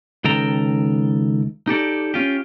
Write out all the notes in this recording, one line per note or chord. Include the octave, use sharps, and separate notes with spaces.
C#2 D#3 A4 G5 A#5
D#4 G4 A4 D5
C#4 F4 G4